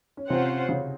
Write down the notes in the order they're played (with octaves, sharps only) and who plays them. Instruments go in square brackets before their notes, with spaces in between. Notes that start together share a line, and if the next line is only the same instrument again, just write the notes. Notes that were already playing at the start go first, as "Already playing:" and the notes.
[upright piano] C#4
[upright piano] C3 C4 [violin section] C#4 F4 C5 F#5
[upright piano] C#3 C#4